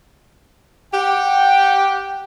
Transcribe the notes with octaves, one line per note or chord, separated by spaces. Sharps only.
G4 F#5 G5